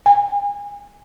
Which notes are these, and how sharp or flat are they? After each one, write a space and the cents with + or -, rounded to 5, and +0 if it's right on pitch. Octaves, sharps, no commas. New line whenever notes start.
G#5 -30